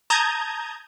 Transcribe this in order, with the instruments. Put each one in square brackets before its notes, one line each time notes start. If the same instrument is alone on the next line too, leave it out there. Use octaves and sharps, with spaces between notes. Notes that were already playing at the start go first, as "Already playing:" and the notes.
[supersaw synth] A5 A#5 D#6 G6 G#6